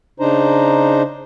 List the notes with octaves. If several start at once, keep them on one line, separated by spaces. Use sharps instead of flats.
C#3 D4 D#4 C5 A#5